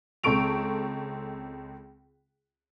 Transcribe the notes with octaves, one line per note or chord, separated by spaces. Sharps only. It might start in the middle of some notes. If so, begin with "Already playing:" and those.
C#2 C4 A4 C#6 D7 F7